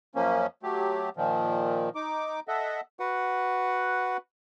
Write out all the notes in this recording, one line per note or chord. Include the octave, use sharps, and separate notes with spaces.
F#2 F3 A#3 C#4
F#3 A3 G4
A#2 D#3 F3
D#4 D6
A4 D#5 E5 F#5
F#4 B4 F#5